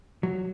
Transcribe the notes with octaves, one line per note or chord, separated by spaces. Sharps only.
F#3